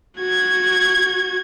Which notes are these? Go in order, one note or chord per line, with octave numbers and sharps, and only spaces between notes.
F#4 G#6